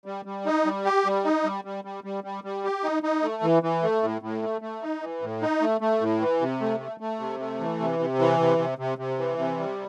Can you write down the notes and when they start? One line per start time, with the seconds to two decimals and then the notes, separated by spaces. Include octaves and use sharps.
0.06 G3
0.25 G3
0.46 D#4
0.65 G3
0.85 G4
1.06 G3
1.24 D#4
1.45 G3
1.65 G3
1.85 G3
2.04 G3
2.24 G3
2.44 G3
2.64 G4
2.83 D#4
3.03 D#4
3.23 A3
3.43 E3
3.63 E3
3.83 A3
4.03 A2
4.22 A2
4.42 A3
4.61 A3
4.82 D#4
5.02 E3
5.22 A2
5.42 D#4
5.61 A3
5.81 A3
6.01 A2
6.21 E3
6.41 C3
6.61 A3
6.80 A3
7.00 A3
7.20 C3
7.40 A3
7.60 E3
7.80 C3
7.99 C3
8.19 E3
8.39 C3
8.58 C3
8.78 C3
8.98 C3
9.18 E3
9.38 C3
9.58 G3